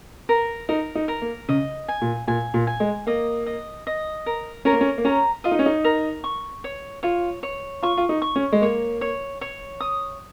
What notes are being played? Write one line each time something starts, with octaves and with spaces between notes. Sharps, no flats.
A#4
D#4 A#4
D#4
A#4
A#3
C#3 D#5
G#5
A#2
A#2 G#5
A#2
G#5
G#3
A#3 D#5
D#5
D#5
A#4
C#4 A#4
A#3
C#4
A#3
C#4 A#5
F4 D#5
D#4
C#4
D#4
A#4
C#6
C#5
F4 C#5
C#5
F4 C#6
F4
D#4
C#6
C#4
G#3
A#3 C#5
C#5
C#5
D#6